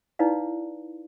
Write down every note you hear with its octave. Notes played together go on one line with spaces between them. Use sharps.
D#4 E4 B4 D5 F5